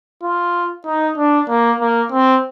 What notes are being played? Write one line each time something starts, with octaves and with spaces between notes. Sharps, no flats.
F4
D#4
D4
A#3
A#3
C4